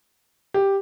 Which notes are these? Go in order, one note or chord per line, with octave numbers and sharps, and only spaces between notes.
G4